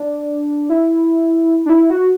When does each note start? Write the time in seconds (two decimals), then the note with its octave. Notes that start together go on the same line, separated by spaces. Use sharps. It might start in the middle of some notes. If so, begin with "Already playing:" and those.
Already playing: D4
0.69 E4
1.66 D4
1.70 E4
1.90 F#4